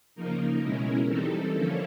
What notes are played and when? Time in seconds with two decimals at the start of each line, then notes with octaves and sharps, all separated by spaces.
0.15 C#3 F3 A#3 D#4 A#4
0.61 B2 G#3 C#4 E4
1.07 E3 G3 C4 D#4 A4
1.53 D3 F3 A#3 C#4 E4